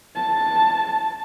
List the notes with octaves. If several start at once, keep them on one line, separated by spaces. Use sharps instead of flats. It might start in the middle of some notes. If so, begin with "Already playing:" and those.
A5